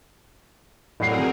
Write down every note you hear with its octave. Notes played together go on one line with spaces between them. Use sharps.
A2 F#3 C4 G#4 A#4 D5 F#5 C7